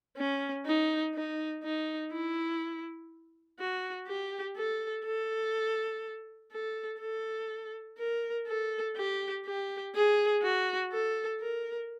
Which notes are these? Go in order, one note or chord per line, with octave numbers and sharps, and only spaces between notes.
C#4
D#4
D#4
D#4
E4
F#4
G4
A4
A4
A4
A4
A#4
A4
G4
G4
G#4
F#4
A4
A#4